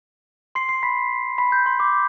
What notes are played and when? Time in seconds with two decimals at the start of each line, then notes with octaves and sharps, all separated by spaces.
0.55 C6 C7
0.69 C6 C7
0.83 B5 B6
1.38 B5 B6
1.52 G6
1.66 C6
1.80 D6